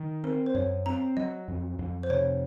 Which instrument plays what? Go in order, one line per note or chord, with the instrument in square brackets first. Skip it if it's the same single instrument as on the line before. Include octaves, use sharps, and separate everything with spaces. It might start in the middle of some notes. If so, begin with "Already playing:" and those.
Already playing: [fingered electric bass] D#3
[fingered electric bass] C4 [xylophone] A#4
[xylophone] C5
[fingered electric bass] F#2 [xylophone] C#5
[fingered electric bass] C4 [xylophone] A#5
[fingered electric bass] F#3 [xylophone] D#5
[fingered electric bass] F2
F2
[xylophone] C5
[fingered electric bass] C3 [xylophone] C#5